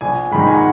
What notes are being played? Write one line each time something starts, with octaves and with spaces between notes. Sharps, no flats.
A#1 G#5
G#2 D#3 B5
A#5
G#5
F#5